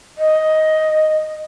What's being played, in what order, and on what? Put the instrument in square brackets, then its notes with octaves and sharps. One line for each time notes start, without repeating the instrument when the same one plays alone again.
[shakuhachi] D#5